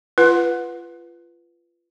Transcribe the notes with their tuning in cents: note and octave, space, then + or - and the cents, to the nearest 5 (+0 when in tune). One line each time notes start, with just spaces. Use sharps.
F4 -25 B4 +0 F#5 -20